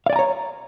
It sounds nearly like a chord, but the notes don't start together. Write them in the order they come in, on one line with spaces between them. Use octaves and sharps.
F5 D5 G#5 A#5 C#5